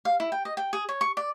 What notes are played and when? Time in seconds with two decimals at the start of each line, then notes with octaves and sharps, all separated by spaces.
0.05 F5
0.20 E4
0.32 G5
0.45 D#5
0.57 G5
0.73 G#4
0.89 C#5
1.01 C#6
1.17 D5